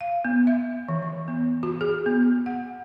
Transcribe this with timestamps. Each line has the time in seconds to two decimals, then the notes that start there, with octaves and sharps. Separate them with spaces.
0.01 F5
0.25 B3
0.47 E5
0.89 E3
1.02 E3
1.28 B3
1.63 F#4
1.81 G#4
2.06 B3
2.46 F#5